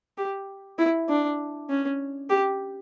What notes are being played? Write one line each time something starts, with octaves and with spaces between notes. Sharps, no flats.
G4
E4
D4
C#4
G4